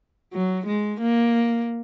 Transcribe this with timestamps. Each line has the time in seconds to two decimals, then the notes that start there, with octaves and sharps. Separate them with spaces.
0.33 F#3
0.67 G#3
1.01 A#3